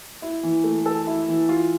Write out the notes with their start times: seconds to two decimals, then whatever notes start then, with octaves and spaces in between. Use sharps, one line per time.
0.22 E4
0.43 E3
0.64 A3
0.86 A4
1.07 E4
1.28 E3
1.49 F4